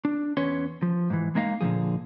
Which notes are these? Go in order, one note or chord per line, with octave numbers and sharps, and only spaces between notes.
D4
E2 C#4 B4 C#5 C6
F3
G#2 E3
G#3 A#3 D#4 E5 F5
A#2 D3 D#3 F3 G#4